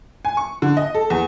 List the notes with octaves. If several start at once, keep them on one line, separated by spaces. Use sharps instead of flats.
G#5
C#6
D3
D#5
A4
E2